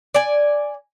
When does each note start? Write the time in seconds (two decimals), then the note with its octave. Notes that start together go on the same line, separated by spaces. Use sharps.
0.14 D5 G#5